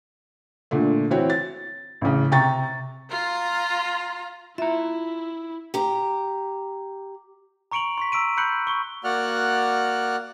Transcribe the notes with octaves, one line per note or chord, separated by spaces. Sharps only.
A#2 D3 A3
E3 C4 F#4 C#5
A6
A1 C#3
C3 G5 A#5 C#6 A6
F4 A#5
E4 F4 E5 A#5
G4 A#5
A#5 C#6 C#7 D7 F7 F#7
C6 C#6 B6
A#5 E6 B6 D7 D#7
B5 F#6 G6 C#7 D7 F#7
C#6 G7
A#3 F#4 D5 F#5 F6 F#6